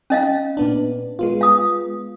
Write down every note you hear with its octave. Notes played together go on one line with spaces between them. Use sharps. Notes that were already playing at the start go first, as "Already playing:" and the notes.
C#4 D#5 F5
A#2 B3 D4
G#3 B3 F4
F5 D#6